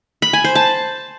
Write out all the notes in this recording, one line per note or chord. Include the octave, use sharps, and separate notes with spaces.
B5
G#5
C5
A5